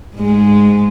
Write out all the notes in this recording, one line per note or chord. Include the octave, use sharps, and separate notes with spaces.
G#2 G#3